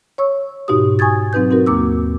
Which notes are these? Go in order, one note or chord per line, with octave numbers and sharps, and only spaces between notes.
C#5 C#6 E6
G#2 B2 D#4 F#4 G4 D#6
G#5 C#6 D#6 G#6 A6
F#3 C4 D#4 B4 G6
C4 D#4 F#4 A#4
D#2 A#3 D6 E6